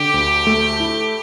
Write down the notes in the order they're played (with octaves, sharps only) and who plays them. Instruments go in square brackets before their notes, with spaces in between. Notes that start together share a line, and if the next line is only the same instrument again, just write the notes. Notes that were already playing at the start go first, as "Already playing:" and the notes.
Already playing: [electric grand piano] D3 [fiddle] G4
[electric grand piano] D2
A3
E4